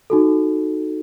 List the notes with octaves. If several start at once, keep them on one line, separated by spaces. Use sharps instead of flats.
D#4 F#4 A4